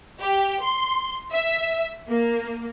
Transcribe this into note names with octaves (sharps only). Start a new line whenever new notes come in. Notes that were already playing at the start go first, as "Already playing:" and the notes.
G4
C6
E5
A#3